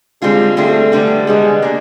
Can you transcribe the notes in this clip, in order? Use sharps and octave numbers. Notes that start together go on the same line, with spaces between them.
D3 G3 G#3 C4 F4 G#4
D3 G3 A3 C4 F4 G#4
D3 G3 B3
D3 G3 G#3 B3
A#3 D4